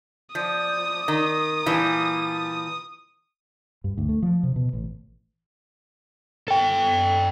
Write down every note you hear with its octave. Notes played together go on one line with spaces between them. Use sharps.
F3 D5 D#6
D#3
A#2 E3 G3 A5
G2
D2
A3
F3
C3
B2
A1
A4 G5